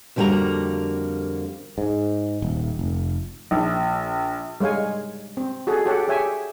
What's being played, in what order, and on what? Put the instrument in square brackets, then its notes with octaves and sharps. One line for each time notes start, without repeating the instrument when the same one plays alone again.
[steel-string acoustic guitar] F2 D3 G3 A#3 F#4 A#5
[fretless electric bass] G#2
D#1
F1
[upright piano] A#1
[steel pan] G3 G#3 C#5 F5 G#5
C4
F#4 G#4 A4
F#4 G4 A4 C#5 F#5
G4 G#4 C#5 E5 G#5